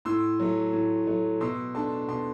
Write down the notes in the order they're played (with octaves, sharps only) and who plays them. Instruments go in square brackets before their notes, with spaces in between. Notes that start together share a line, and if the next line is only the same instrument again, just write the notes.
[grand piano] A2 C6 E6
F#3 A3
A2
F#3 A3
B2 C6 E6
A3 D4 A5 C6
B2 A5 C6